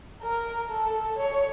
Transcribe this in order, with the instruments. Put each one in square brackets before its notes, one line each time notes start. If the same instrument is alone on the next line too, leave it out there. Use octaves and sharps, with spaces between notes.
[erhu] A#4
A4
C#5